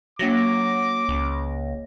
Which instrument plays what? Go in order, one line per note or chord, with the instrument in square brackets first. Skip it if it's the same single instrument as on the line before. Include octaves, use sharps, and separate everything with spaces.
[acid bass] F#3 [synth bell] A#3 C#5 A#6 [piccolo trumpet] D6
[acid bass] C#2